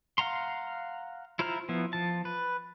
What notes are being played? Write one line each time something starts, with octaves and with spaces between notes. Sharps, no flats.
F5 F#5 A#5 C6
E4 F4 C5 A#5 F6
F3 B3 E4
F3 A5
B4